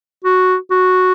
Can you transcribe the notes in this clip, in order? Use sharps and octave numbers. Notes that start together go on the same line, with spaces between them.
F#4
F#4